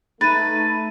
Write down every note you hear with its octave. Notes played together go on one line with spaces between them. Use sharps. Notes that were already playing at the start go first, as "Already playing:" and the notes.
A3 D#4 B4 A6 D#7